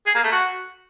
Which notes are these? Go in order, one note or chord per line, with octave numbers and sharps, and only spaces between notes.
G#4
A#3
A3
F#4